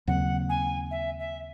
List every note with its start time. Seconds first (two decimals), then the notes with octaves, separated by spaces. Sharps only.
0.07 D#2 C#3 F#3 C4 F#5
0.49 G#5
0.91 E5
1.19 E5